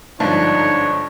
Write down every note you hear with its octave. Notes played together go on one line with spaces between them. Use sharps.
G1 G#2 D3 F3 D4 D#4 C#5